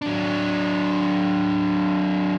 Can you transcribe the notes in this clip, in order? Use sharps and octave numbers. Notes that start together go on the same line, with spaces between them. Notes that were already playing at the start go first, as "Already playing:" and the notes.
F#3 D4